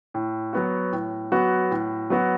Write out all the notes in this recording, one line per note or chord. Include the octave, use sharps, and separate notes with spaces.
A2
F#3 B3 F#4
A2
F#3 B3 F#4
A2
F#3 B3 F#4